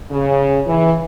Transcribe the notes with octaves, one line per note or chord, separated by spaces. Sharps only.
C#3
E3